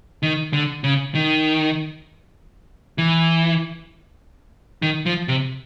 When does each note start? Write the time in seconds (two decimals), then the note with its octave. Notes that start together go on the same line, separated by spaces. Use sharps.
0.23 D#3
0.53 D3
0.84 C#3
1.15 D#3
2.98 E3
4.82 D#3
5.06 F3
5.28 C3